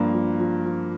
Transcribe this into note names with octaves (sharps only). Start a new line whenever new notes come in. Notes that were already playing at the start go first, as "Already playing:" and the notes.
Already playing: G2 F3 A#3
F3
F3
F3